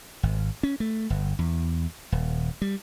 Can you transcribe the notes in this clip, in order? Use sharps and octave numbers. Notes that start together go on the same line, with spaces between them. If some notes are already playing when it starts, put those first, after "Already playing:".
G#1
C#4
A3
G1
E2
D#1
G3